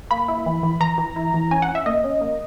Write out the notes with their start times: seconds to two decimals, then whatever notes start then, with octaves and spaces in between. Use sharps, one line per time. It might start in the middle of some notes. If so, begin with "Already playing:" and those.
0.11 A#3 B5
0.28 E4
0.46 E3
0.63 E3
0.80 E3 A#5
0.98 E3
1.16 E4
1.34 E3
1.51 C#4 G#5
1.62 F#5
1.68 C#4
1.75 E5
1.86 A#3 D#5
2.04 C#4
2.21 A#3